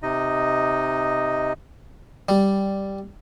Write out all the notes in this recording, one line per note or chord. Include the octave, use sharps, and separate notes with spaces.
C3 D#4 D#5
G3